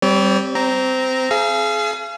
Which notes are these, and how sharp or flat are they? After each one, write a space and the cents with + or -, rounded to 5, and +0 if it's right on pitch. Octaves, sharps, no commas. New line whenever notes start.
G3 +0 C4 +0 C#5 +40
C4 -15 A#5 +0
G#4 +30 F5 -35